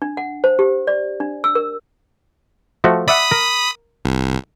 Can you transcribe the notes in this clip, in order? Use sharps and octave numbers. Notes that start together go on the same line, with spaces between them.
D4
F#5
C5
G4
D5
D4
E6
A#4
F3 A3 F#4
D5 E5 F#5 B5 D#6
A#4
C2